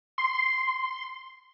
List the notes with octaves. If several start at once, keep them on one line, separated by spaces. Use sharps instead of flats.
C6